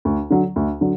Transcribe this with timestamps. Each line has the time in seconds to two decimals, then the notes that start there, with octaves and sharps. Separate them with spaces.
0.05 D2
0.30 D3 F#3
0.56 D2
0.81 D3 F#3